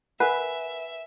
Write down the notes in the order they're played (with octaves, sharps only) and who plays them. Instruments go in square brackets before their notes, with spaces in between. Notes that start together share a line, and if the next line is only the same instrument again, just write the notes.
[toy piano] A#4 F#5 [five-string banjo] B4 [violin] E5 [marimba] G#5 F#6